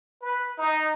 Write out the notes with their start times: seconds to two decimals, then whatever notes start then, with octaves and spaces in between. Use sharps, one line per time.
0.22 B4
0.58 D#4